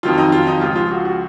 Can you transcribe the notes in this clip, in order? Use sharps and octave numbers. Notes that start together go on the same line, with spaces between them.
F2 D#3 F#3 F4
D#4
F4
D#4
C#2 C#3 F3 F4
F4
F#4
F#4